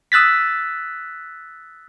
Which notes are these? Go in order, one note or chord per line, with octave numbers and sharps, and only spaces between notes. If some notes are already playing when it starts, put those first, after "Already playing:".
D#6 E6 F#6 A6 B6